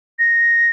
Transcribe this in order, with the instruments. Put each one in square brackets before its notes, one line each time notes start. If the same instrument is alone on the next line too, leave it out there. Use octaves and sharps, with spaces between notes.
[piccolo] A#6